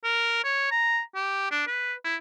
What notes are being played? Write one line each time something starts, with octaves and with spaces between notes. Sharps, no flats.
A#4
C#5
A#5
G4
D4
B4
E4